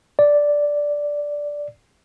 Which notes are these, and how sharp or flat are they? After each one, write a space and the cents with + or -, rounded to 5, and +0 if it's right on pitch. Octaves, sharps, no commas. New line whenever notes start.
D5 -5